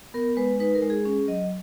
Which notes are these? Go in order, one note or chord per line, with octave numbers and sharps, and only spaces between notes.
B3 A#4
G#3 B4
D#4 B4
A#4
G#3
G#4
C#4 G#4
F#3 D#5